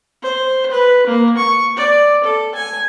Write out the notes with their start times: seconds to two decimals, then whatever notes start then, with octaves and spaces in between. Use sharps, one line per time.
0.22 C5
0.70 B4
1.07 A#3
1.37 C#6
1.76 D5
2.23 A4
2.55 G#5